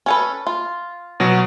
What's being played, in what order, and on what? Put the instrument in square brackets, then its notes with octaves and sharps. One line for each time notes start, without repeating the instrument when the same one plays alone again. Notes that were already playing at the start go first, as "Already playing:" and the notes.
[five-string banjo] C#4 A4 B4
F4
[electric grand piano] B2 F#3 F#4